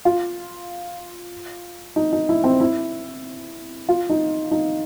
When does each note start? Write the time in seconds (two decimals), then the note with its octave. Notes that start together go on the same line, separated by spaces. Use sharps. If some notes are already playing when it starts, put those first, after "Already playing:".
0.05 F4
1.96 D#4
2.13 D#4
2.29 E4
2.44 C4
2.60 E4
3.89 F4
4.09 D#4
4.51 D#4